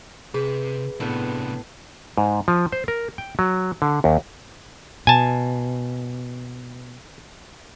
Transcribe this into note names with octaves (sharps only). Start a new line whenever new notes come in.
C3 G#4 B4
A2 C3 B3 D4
G#2
F3
C5
A#4
G5
F#3
D3
D#2
B2 G#5 A5